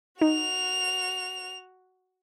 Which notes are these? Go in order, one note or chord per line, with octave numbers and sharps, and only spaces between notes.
D#4 F#4 F7